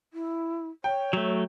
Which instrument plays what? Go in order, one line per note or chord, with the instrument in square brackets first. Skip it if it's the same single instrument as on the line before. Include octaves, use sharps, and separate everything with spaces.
[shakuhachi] E4
[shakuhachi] C#5 [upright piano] G5
[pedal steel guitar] F#3 A3